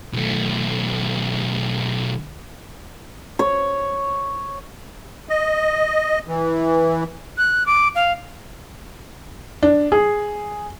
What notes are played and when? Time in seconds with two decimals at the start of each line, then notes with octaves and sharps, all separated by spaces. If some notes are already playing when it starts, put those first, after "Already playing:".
0.13 B1 A3
3.39 C#5
5.29 D#5
6.28 E3
7.38 F#6
7.66 D6
7.95 F5
9.63 D4
9.92 G#4